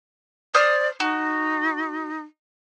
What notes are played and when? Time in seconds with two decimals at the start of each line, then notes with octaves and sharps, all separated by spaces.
0.54 C5 D5 D#6 F6
1.00 D#4 F#4